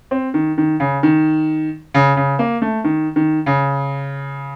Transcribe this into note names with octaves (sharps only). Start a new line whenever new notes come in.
C4
D#3
D#3
C#3
D#3
C#3
C#3
A#3
A3
D#3
D#3
C#3